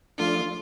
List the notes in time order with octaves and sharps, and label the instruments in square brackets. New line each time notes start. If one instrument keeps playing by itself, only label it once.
[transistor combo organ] F3 A3 D4 [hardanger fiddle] F4